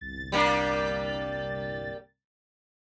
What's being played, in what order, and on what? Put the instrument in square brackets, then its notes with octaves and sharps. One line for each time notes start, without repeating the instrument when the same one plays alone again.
[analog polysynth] G1 C2 A6
[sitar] G3 A#3 D4